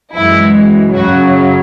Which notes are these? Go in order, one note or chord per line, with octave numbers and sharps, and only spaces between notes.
F#2 E3 G#3 E4
F#2 C#3 F#3 F#4